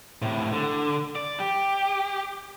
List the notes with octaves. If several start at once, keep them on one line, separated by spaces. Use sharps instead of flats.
A2 C3
D3
D5
G4